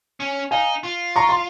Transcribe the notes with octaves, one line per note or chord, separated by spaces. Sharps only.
C#4
D#4 F5 G#5
F4
A#5 C#6
C6